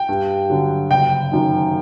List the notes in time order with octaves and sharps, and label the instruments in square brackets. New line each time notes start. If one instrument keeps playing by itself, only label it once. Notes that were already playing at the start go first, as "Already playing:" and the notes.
Already playing: [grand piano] G5
G2
D3 F#3
F#1 G5
F#2 D#3